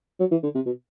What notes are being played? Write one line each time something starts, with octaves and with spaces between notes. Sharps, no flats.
F#3
E3
D3
C3
B2